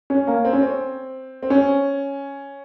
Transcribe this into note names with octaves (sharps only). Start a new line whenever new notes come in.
C#4
A#3
C4
C#4
C4
C4
C#4